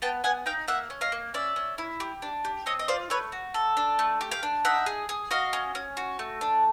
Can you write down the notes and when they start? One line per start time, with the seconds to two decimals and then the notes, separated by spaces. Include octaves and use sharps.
0.02 B3 G5 A5
0.24 B3 F#5 G#5
0.46 D#4 F5 G5
0.68 A#3 E5 F#5
0.90 C#4
1.01 D#5 F5
1.12 A#3
1.34 C#4 D5 E5
1.56 C#4
1.78 E4
2.00 G4
2.22 D4
2.45 G4
2.66 C4 C#5 D#5
2.79 D#5
2.88 F4 C5 D5
3.10 A3 B4 C#5
3.32 F#4
3.54 A4
3.77 D4
3.99 A3
4.21 G4
4.31 F5 G5
4.43 D4
4.65 D#4 E5 F#5
4.86 G#4
5.09 G#4
5.31 F#4 D#5 F5
5.53 C#4
5.75 C#4
5.97 F#4
6.19 A3
6.41 D4